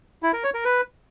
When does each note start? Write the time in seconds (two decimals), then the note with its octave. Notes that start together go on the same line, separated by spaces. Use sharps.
0.23 E4
0.33 A#4
0.44 C#5
0.54 A#4
0.65 B4